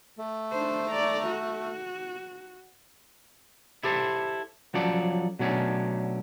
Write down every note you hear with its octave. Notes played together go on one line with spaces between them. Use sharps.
A3
D4 C5
D5 A#5
F#4
E4 G4 A4 C5
F3 F#3 C#4 A4 D5
B2 F#3 A3 C#4 D4